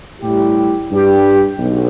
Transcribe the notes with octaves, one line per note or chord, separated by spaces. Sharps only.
A2 G3 E4 G4
G2 G3 D4 G4
B1